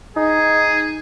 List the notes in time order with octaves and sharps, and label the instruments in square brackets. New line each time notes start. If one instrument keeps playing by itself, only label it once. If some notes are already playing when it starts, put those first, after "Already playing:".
[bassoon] D#4 [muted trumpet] G#4